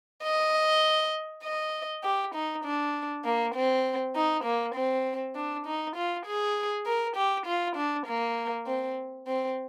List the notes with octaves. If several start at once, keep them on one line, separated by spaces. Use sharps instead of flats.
D#5
D#5
G4
D#4
D4
A#3
C4
D#4
A#3
C4
D4
D#4
F4
G#4
A#4
G4
F4
D4
A#3
C4
C4